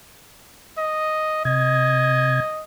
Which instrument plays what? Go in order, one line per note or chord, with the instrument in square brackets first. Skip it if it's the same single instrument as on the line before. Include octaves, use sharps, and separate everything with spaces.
[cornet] D#5
[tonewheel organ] C3 G#6 [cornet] D#5